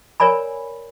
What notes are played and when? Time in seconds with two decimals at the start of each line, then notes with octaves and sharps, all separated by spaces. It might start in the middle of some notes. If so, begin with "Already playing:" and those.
0.20 A#4 C#5 D5 G#5 B5